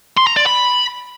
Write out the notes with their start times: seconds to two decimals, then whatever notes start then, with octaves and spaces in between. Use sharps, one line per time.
0.17 C6
0.27 A#5
0.37 D5
0.46 B5